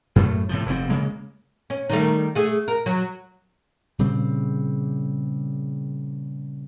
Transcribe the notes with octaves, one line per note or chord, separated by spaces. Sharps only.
F#2 A2 G#3 A3
A2 C3 F3
F1 G#2 C3 C4
C#3 G#3 A#3
C#4
D#3 G3 A3
A3 G#4
A#4
F#3
A#2 C#3 G3 C4